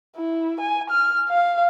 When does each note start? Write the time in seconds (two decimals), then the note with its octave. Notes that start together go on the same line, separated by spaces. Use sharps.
0.17 E4
0.61 G#5
0.90 F6
1.29 F5